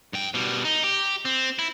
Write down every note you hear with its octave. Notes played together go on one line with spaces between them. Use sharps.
G2 G5
B2 G3
D#4
G4
C4
E4